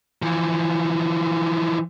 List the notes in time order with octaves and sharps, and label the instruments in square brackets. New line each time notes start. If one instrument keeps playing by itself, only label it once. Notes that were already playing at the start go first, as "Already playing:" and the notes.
[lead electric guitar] E3 F3